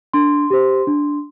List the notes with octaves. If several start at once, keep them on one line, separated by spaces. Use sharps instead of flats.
D4 C6
G4 C5
D4